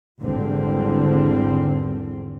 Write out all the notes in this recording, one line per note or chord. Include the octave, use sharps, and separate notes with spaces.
G#1 E2 D3 G3 C4